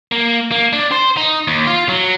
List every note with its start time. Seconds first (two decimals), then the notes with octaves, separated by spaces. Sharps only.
0.12 A#3
0.51 A#3
0.73 D4
0.91 C5
1.17 D#4
1.47 D#2
1.67 F4
1.89 F#3